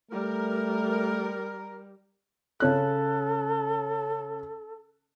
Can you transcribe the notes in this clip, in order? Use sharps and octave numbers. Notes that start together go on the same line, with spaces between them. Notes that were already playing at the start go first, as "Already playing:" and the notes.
G3 A3 A#4
C#3 C#4 A4 F#6